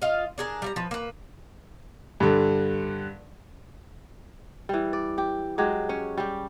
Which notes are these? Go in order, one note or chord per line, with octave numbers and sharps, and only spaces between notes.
F4 D#5 F5
D4 G#4 A#4
G3 E5 A#5
F3 B4
A#3 B4
G2 D3
E3 G3
D5
G4
F#3 G#3 G4
C#4
G3 G4